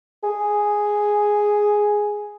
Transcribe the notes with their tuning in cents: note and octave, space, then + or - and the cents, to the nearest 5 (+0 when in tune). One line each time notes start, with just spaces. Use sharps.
G#4 +0